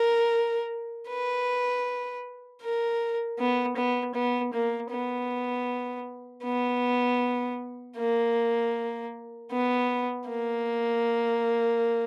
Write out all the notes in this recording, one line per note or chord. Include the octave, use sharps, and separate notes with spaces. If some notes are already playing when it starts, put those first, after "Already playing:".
Already playing: A#4
B4
A#4
B3
B3
B3
A#3
B3
B3
A#3
B3
A#3